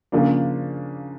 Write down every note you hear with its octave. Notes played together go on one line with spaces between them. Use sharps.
C#3 F3 A#3 D4 F4